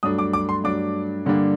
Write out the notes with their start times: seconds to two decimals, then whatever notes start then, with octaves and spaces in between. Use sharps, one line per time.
0.03 G2 F#3 A3 D4 D#6
0.19 D6
0.33 D6
0.49 C6
0.64 G2 F#3 A3 D4 D6
1.26 G2 D3 G3 A#3 D4